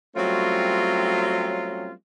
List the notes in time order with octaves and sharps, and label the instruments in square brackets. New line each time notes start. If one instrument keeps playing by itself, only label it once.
[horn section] F#3 G3 A3 C4 C#4 F4